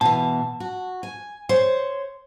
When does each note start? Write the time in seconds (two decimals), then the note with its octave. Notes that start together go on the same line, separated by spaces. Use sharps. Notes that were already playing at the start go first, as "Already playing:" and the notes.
0.01 B2 E3 A5
0.60 F#4
1.03 G#5
1.49 C5 C#5